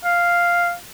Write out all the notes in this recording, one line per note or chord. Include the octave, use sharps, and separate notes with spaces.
F5